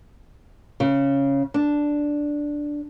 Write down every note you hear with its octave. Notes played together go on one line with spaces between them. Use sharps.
C#3
D4